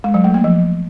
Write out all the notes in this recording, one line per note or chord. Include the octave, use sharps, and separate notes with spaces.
G#3
F#3
A3
A#3
F3